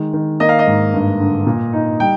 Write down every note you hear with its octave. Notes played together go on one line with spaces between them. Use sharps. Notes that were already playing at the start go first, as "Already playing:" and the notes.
Already playing: D#3 G#3
D#3
A#3 D#5
F5
D#5
G#2
G2
D3
A#2
D#4
G3 G5